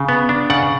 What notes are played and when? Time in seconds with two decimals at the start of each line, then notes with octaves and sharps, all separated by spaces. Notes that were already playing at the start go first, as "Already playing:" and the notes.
Already playing: C#3
0.09 B3
0.29 D4
0.50 C#3 D5 F#5